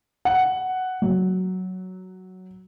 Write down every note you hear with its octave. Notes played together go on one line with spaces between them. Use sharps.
F#5
F#3